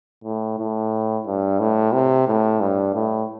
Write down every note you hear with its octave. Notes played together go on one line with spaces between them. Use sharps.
A2
A2
G2
A2
C3
A2
G2
A2